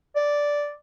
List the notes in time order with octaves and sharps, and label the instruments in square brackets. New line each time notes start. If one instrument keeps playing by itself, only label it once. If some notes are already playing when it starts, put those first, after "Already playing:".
[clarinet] D5